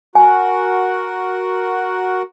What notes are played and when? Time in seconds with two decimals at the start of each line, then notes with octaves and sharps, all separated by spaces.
0.15 F#4 A#4 F#5 G#5